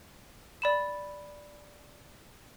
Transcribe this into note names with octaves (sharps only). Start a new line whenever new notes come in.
D5 B5 E7